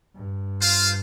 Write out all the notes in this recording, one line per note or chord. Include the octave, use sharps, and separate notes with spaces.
G2
F4 C5 F5